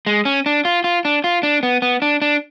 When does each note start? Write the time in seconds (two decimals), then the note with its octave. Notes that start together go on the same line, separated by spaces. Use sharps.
0.06 G#3
0.25 C#4
0.46 D4
0.65 F4
0.84 F4
1.05 D4
1.24 F4
1.43 D4
1.63 B3
1.82 B3
2.02 D4
2.22 D4